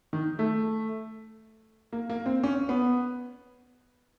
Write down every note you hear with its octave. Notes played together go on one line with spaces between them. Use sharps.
D#3
A3
A#3
A#3
C4
C#4
B3